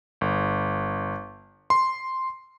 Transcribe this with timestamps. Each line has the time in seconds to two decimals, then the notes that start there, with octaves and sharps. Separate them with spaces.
0.21 G1
1.70 C6